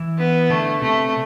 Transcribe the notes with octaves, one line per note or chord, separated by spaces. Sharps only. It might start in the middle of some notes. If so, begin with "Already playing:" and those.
Already playing: E3 E4
B3
D3 A3 D4
C3 A3 C4